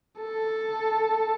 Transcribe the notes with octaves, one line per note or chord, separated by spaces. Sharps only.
A4